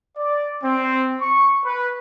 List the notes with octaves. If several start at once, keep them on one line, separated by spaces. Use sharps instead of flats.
D5
C4
C#6
B4